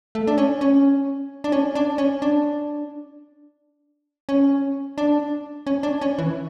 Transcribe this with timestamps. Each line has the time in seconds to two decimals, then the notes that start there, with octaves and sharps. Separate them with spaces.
0.15 A3
0.27 D4
0.38 C#4
0.61 C#4
1.44 D4
1.52 C#4
1.75 D4
1.98 C#4
2.22 D4
4.29 C#4
4.98 D4
5.67 C#4
5.83 D4
6.01 C#4
6.18 E3